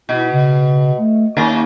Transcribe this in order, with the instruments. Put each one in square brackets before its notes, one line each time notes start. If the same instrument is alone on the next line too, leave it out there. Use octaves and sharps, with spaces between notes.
[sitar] B2 [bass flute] E4
[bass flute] C#3
A3
[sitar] D#2 C#4 A#4 [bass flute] A#3